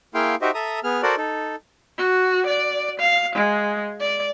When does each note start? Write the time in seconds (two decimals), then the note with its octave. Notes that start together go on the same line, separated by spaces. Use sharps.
0.14 A#3 E4 G#4 F5 G5 C6
0.42 D#4 F#4 G4 C5 D#5 E5
0.54 A4 E5 A#5 D#6
0.84 B3 G#4 F6
1.03 F#4 A4 A#4 C5 D5 F#5
1.17 D#4 A4
1.98 F#4
2.47 D5
3.00 F5
3.35 G#3
4.00 D5